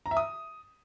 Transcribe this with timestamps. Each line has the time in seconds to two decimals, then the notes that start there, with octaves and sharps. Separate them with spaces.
0.06 A#5
0.11 E5
0.17 D#6